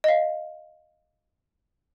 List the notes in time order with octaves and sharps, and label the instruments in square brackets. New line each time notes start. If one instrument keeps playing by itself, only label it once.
[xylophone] D#5 F5